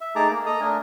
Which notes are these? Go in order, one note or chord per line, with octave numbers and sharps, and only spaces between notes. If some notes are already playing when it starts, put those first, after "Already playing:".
E5
A3 D#4 G#4 A5 A#5 D6
A#3
A4 D#5 A#5 D#6
A3 D4 A#4 G#5